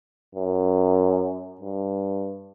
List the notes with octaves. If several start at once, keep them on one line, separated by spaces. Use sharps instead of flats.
F#2
G2